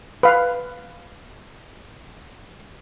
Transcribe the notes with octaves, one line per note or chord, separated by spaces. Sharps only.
B4 F5